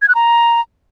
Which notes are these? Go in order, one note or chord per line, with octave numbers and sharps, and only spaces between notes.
G#6
F#6
A#5